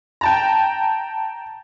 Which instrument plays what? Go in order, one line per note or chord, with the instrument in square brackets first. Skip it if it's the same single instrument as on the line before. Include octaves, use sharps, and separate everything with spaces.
[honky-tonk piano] G5 A5 A#5